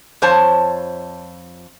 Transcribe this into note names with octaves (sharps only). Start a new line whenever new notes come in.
F2 C5 C#5 A5